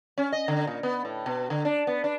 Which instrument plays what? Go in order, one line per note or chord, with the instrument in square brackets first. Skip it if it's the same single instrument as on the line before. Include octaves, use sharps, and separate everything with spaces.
[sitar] C#4
D#5
D3
A#2
B3
A2
B2
D3
D4
B3
D4